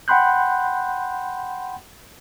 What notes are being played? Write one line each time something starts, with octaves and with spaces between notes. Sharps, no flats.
F#5 G5 B5 C6 F#6 G6